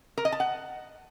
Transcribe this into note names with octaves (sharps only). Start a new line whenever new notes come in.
A#4
D#5
A5
F#5